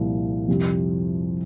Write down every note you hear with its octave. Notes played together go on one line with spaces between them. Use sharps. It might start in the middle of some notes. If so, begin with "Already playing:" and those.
Already playing: C2 A#2 F3
F2 C3 G3 C4 G4